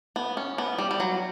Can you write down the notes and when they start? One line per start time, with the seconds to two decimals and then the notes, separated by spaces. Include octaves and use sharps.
0.16 B3
0.37 C#4
0.58 B3
0.78 G3
0.91 G3
1.00 F#3